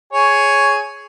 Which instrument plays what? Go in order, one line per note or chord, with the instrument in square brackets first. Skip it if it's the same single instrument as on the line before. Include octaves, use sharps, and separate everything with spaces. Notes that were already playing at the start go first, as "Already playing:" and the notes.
[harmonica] G#4 C#5 G#5